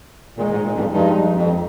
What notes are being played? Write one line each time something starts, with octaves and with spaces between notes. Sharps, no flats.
A#2 D#3 G#3 D#4
G#2
A#2
F2
G2
G2 F3 G#3 D#4
F2